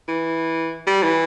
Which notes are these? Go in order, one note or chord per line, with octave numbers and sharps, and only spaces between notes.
E3
G3
E3